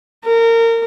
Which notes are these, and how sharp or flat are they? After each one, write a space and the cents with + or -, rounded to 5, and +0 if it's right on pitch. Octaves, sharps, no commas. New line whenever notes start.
A#4 -25